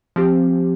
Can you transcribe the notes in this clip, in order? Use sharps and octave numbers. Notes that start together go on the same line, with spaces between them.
F3 C4 G4